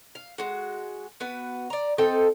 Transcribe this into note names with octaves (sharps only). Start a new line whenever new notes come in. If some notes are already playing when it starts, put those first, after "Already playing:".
F5
G#3 F#4
B3 F#4 B4
D5 A#5
C4 D#4 A4 G5